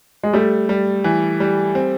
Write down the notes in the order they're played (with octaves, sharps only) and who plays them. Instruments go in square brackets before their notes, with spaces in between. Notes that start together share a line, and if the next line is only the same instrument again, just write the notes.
[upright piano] G#3
[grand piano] G3 [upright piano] A3
[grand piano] G3
E3
G3
C4